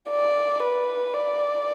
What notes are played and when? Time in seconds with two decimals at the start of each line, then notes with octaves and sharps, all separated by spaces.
0.11 D5
0.63 B4
1.14 D5